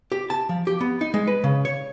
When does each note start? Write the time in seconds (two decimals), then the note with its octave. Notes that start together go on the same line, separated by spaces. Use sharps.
0.12 G4
0.30 A5
0.49 F3
0.67 G4
0.81 B3
1.01 D#4
1.14 G#3
1.27 B4
1.44 C#3
1.65 C#5